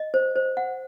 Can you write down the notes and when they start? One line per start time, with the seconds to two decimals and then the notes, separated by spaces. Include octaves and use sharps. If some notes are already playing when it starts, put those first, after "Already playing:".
Already playing: D#5
0.14 C5
0.36 C5
0.57 F#5